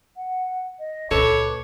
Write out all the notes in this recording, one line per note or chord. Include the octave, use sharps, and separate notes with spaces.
F#5
D#5
C#2 A#2 A4 B4 C#5 D6